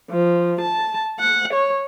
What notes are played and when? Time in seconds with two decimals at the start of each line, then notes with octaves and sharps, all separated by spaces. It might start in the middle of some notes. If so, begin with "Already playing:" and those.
0.10 F3
0.61 A5
1.20 F#5
1.54 C#5